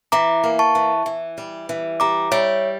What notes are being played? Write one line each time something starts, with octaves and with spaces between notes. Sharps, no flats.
E3 A#5 D6
A#3
A5 C#6
E3
E3
G3
E3
G3 A#5 D6
G3 C#5 E5